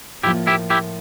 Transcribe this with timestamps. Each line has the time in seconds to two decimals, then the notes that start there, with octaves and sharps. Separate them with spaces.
0.23 A2 F3 A#3 E4 G4
0.47 E4 G4
0.70 E4 G4